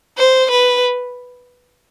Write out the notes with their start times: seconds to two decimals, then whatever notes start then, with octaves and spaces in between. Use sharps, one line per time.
0.17 C5
0.51 B4